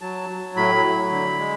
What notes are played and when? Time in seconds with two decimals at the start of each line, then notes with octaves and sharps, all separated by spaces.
0.01 F#3 A5
0.30 F#3
0.56 A2 B5
0.84 F#3
1.11 D3
1.39 G#3